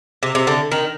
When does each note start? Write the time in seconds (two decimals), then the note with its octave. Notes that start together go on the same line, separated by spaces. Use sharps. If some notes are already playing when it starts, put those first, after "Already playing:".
0.23 C3
0.35 C3
0.47 D3
0.72 D#3